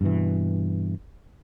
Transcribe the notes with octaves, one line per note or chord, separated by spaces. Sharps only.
G2 B2 E3